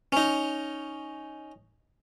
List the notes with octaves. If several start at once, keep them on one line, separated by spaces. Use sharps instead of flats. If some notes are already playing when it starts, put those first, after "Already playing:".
C#4 D#4